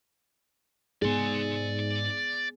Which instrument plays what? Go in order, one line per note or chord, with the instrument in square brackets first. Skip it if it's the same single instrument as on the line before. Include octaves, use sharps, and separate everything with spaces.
[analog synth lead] G#2 [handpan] B3 G#4 [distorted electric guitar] D5 C6